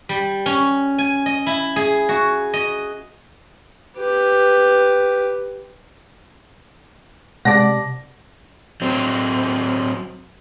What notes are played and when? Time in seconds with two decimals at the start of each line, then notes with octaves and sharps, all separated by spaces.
0.09 G3
0.46 C#4
0.98 G#5
1.26 D#5
1.46 E4
1.76 G#4
2.09 F#4
2.54 D#5
3.98 G4 B4
7.45 C3 G#3 D5 F#5 A5 D6 A#6
8.82 F#3 C4